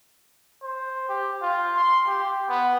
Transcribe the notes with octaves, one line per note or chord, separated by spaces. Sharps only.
C5
G4
F4
C6
G4
B3